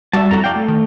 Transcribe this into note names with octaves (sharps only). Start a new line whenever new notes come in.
G3 F#4 D5 E5 A5
F2 E4 F#4 A4 A#5
D5 F5 G5
A3
D#3